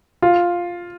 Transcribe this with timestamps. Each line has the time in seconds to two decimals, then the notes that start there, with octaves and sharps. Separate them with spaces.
0.22 F4